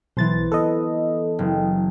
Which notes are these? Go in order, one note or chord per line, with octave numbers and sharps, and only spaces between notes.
B1 E3 C5 A6
B3 A4 D#5
F#1